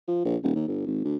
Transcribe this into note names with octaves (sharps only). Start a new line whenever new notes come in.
F3
A#1
D#1
D#2
G1
G#1
D2